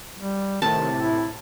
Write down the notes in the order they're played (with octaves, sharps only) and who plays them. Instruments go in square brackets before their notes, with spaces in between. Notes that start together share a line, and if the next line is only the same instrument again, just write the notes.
[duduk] G3
[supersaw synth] A2 C3 [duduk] D#3 [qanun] A5
[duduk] E4